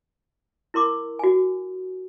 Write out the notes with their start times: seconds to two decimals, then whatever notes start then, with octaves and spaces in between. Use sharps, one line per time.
0.74 E4 A#4 C6 D6
1.19 F#4 G#5